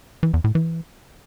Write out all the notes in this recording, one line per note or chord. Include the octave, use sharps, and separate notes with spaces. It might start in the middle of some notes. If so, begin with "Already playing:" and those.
E3
E2
A2
E3